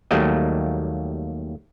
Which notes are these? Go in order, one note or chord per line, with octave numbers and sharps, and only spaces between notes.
D#2 F#3 G3 A3 A#3 D#5